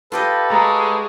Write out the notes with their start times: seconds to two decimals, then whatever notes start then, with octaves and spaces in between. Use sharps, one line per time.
0.12 F4 G4 A4 B4 D#5
0.50 G#3 A5 A#5 C#6